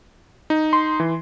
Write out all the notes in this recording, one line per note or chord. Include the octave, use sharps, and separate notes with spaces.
D#4
C6
E3